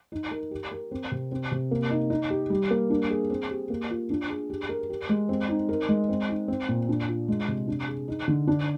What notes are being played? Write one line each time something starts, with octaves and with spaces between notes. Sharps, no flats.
D#4
A#4
G4
A#4
C4
C3
C4
C3
A#3
D#4
D#4
G4
G3
A#3
D4
G#4
C4
G4
A#3
F4
D4
G#4
G4
A#4
G4
G#3
C4
D#4
A#4
G#3
C4
D#4
C4
A#2
D4
F4
G#3
C3
D4
G#4
D#4
D3
D4